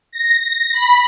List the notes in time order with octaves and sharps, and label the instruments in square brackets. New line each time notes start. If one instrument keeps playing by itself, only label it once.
[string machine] A#6
B5